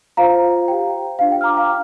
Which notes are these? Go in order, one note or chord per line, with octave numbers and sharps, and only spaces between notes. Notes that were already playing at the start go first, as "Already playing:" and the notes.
F4 C5 F5 A#5
G4 C5 G5
D4 F4 C5 F5
G5
F6
A#5 D6
F5 A#5